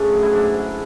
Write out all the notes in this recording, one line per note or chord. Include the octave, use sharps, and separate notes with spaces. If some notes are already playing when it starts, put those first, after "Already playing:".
Already playing: C#3 A3 D4
F#3
E4
G#2 D4
G#2